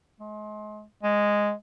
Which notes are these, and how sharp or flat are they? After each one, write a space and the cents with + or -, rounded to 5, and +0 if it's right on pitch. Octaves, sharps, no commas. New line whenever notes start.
G#3 +35
G#3 -5